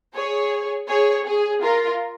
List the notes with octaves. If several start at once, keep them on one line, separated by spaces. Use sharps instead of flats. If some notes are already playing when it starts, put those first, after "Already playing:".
G#4 C#5
G#4 C#5
G#4
F4 A#4